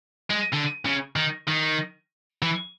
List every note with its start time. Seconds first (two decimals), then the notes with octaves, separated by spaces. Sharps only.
0.30 G#3
0.53 D3
0.85 C#3
1.16 D#3
1.48 D#3
2.42 E3